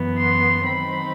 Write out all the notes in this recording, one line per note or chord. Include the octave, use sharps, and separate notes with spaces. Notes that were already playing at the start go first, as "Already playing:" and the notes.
Already playing: F#2 E3 B3
C6
D#3 F#3 C4 D#4 B5